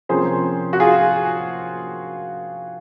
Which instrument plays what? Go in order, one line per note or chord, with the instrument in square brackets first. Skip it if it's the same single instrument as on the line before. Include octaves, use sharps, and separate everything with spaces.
[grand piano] C3 F3 A#3 C#4 G#4 C5
F#4
F4 G#4